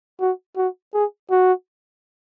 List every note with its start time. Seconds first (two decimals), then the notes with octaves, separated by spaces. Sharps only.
0.21 F#4
0.57 F#4
0.94 G#4
1.31 F#4